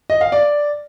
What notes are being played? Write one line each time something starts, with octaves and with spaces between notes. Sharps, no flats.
D#5
F5
D5